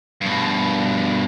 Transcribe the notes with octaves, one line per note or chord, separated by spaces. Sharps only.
G2 B2